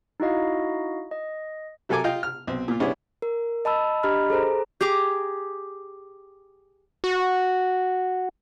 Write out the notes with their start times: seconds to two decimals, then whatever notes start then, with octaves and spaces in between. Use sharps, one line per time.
0.20 D#4 E4 F#4 D#5 F5
1.11 D#5
1.89 C3 F#3 A4 A#4 G#5 D6
2.04 F4 D#5 F5 G5
2.23 F6
2.47 B1 C4
2.68 A#2 F4
2.80 G3 B3 C#4 D4 E4 G#4
3.22 A#4
3.65 D#5 A5 B5 E6
4.03 D4 G4 D#5 A#5 B5 F6
4.30 G#4 A4 C5 A#5
4.81 G4 G#4 A#5 D6
7.04 F#4